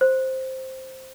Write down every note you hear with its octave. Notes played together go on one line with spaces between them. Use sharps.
C5